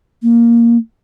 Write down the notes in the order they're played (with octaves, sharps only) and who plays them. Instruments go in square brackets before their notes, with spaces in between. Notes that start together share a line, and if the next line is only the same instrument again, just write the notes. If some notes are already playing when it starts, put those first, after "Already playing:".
[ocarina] A#3